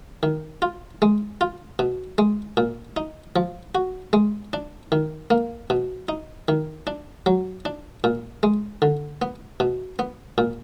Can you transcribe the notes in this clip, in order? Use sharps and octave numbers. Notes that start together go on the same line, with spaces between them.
D#3
F4
G#3
F4
B2
G#3
A#2
D#4
F3
F#4
G#3
D4
D#3
A#3
B2
D#4
D#3
D4
F#3
D4
A#2
G#3
D3
B3
B2
B3
A#2